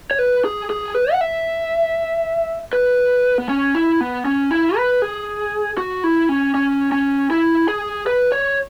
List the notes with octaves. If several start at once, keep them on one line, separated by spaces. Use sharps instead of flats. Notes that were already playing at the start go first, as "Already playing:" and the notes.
C#5
B4
G#4
G#4
B4
F#5
E5
B4
B3
C#4
E4
B3
C#4
E4
B4
G#4
F#4
E4
C#4
C#4
C#4
E4
G#4
B4
C#5